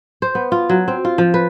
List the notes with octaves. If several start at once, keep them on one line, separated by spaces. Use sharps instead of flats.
C5
B3
F4
F#3
C4
F4
F3
B4